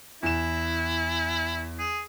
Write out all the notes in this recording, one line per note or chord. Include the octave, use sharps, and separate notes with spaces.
E2 E4 E7
G#4